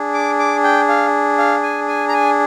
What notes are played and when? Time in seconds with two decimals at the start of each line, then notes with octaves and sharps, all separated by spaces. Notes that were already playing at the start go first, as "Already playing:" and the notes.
Already playing: D4 G#4
0.14 D6
0.39 D6
0.64 G5
0.89 F5
1.38 F5
1.63 G#5
1.88 G#5
2.09 A#5
2.13 G#5